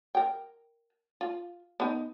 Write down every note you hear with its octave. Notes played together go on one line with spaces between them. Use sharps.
A#4 G5
F4
B3 D#4